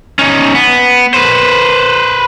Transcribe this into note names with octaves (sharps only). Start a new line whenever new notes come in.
C#4 D#4
B3
B4 C5